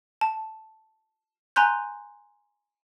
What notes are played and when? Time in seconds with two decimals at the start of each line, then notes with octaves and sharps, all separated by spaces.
0.21 A5
1.56 G#5 A#5 C6 F#6 G6